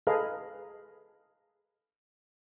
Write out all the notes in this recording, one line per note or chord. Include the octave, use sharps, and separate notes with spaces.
G#4 A4 B4 D#5 F5 A#5